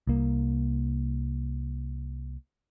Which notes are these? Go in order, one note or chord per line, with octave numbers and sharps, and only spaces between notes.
C2 A#3